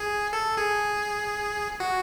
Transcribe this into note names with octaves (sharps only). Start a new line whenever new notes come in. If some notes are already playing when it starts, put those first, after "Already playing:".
Already playing: G#4
A4
G#4
F#4